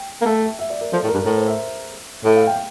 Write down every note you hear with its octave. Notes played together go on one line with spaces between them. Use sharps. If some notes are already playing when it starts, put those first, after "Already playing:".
Already playing: G5
A#3
A3 E5
E5
E5
D5
A#4
F3 A4
A2
A#4
G2
A2 A#4
C5
E5
A2 E5
F5
G5